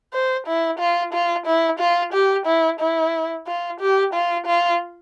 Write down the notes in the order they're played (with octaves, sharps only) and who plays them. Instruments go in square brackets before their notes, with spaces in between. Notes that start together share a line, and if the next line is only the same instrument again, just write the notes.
[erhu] C5
E4
F4
F4
E4
F4
G4
E4
E4
F4
G4
F4
F4